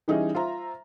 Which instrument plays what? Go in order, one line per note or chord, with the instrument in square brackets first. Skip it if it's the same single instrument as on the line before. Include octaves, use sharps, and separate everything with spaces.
[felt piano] E3 G3 C#4 D#4 E4 G#4
F4 C5 E5 A#5